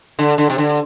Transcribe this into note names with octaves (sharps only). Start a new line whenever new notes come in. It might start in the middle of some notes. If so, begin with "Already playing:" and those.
D3
D3
C3
D3